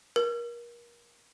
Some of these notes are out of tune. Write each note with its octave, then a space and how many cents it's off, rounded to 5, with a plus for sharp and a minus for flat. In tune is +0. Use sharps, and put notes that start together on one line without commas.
A#4 +30